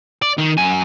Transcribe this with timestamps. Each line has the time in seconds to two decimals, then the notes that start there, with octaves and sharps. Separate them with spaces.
0.22 D5
0.38 D#3
0.58 F#2 G#5